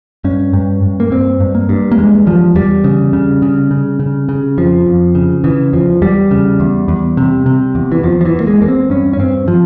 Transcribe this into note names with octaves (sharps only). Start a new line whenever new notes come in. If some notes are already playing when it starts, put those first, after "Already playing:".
G2 C#4
G2
G2
A#3
G2 C4
G2
A#3
G2
A#3
E2 G#3
E2 F3
E2 G3
C#3
C#3
C#3
C#3
C#3
C#3
F2 F3
F2
C#3
C#3 E3
E2 F3
E2 G3
C#3
E2
E2
C3
C3
E2
E3
E2 F3
F3
E3
E2
A#3
G#3
E2 A#3
C4
G2 C#4
C#4
G2 C4
F3